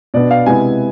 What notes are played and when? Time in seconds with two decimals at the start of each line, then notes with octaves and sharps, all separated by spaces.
0.14 B2 B3 D4 D5
0.31 F5
0.46 C3 G#3 B3 E4 G#5